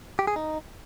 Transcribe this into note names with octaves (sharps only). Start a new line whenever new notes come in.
G4
G#4
D#4